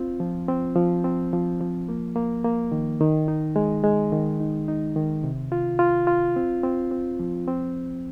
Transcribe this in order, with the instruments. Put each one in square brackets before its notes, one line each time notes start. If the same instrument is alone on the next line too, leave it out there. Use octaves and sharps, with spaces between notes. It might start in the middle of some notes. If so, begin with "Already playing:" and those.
Already playing: [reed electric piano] C4 F4
F3
C4
F3
C4
F3
F3
A#3
A#3
A#3
D#3
D#3
D#4
G#3
G#3
D#3
D#4
D#4
D#3
C3
F4
F4
F4
C4
C4
C4
F3
C4